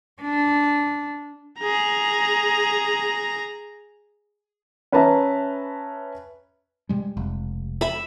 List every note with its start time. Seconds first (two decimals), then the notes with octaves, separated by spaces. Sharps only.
0.22 D4
1.59 G#4 A#5
4.92 C#4 B4 E5 A5 A#5
6.89 B2 G3 G#3
7.17 F1
7.81 E5 B5